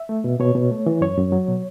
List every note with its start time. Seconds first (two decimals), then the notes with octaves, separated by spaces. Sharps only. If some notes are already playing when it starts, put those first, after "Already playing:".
Already playing: E5
0.09 A3
0.24 B2
0.39 B2 C#5
0.55 B2
0.71 A3
0.86 E3
1.01 F#2 C#5
1.18 F#2
1.32 F#3
1.48 B2